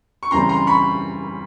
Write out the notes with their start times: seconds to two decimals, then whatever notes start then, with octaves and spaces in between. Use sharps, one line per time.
0.23 C#6
0.31 F#2 C#3 E3 G3 C4 A#5 C6
0.49 A#5 C6
0.67 B5 C#6